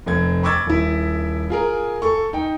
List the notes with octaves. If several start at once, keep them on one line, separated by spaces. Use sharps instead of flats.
F1 C4 G#6
B5 C#6 D6 E6 G#6 A6
D#1 E4
F4 G#4 A#4
A4 C#6
D#4 G5